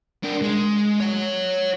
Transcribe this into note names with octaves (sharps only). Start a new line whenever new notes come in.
D4 A#4
G#3
C#5 F#5